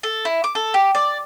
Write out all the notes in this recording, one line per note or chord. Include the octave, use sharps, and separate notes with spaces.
A4
E4
D6
A4
G4
D5